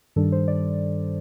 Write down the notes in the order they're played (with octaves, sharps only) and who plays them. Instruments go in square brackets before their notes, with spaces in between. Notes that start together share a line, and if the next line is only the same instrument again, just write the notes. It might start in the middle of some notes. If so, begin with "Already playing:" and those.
[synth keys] G2 D#3 G3 D4 A4
C5
D5